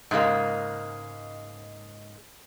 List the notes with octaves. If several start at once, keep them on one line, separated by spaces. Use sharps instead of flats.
G#2 C#3 G#3 A#3